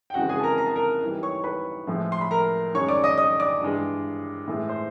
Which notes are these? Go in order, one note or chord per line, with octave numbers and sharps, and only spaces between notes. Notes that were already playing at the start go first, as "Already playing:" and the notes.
G5
F2 C#3 E3 G#3 F#4 F#5
G#4 G#5
A5
A#4 A#5
A#5
A5
A#4 A#5
G#2 E3 G3
C#5 C#6
B4 B5
A2 F3 G#3
C6
B5
A#4 A#5
F#2 D#3 G#3 C#5 C#6
D5 D6
D#5 D#6
D#5 D#6
D5 D6
G2 E3 G#3
A2 E3 G#3
C5 C6